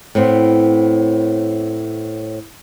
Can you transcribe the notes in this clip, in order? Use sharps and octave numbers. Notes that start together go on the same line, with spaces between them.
A2 B3 C4